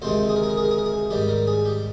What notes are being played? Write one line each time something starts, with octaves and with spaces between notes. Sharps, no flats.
D2 C3 D#3 G#3 C5
G#4
A#4
G#4
A#4
G#4
A#4
G#4
A#4
G#4
G#2 D#3 G3 G4
A#4
G#4
G4